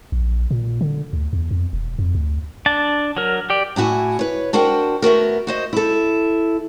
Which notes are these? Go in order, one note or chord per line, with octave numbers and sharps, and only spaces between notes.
A#1
A#2
D3
D2
E2
F2
E1
F2
D2
D4 A5
F#3 A#4
G4 D5
A2 E4 F#4 G#5
B4 C#5
D4 F#4 A#4 C5 F#5 G5
A3 B3 F#4 A#4
F#4 C5 D#5
E4 A4